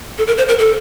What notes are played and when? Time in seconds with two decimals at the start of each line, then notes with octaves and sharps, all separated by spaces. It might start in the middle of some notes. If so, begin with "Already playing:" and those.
0.18 A4
0.27 A#4
0.38 C5
0.49 A#4
0.59 A4